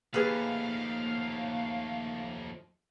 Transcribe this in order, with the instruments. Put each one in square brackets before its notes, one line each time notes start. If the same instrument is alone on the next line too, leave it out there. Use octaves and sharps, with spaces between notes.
[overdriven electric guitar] D#2 [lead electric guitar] F3 A3 [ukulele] G#4 B4 [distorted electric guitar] F5